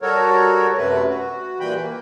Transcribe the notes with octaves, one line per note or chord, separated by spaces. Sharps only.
G3 F#4 A4 A#4 C#5
F#2 C3 A3 B4
F#4
A#2 E3 G3 B4 G5 B5
A#3